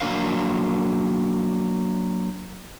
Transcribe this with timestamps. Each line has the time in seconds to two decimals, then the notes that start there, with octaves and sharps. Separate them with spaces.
0.01 F#3 A#3 D4 A#4 C5 F5